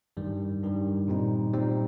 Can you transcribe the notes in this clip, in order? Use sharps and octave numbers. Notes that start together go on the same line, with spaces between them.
G2 D#3 G3
G2 D#3 G3
A#2 G3 C4 D#4
A#2 G3 C4 D#4